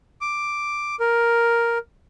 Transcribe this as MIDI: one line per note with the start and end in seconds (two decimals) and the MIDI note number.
0.21 0.95 86
1.00 1.78 70